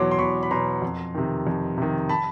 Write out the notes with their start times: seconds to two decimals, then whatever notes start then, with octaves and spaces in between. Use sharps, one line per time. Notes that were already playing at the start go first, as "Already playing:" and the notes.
Already playing: E2 B2 F#3 C6 D6
0.11 C6
0.18 E2 B5 C#6
0.43 B5
0.51 B2 F#3 A#5 C6
0.82 F2
1.15 C3 D#3
1.47 F2
1.78 C3 D#3
2.09 A5 B5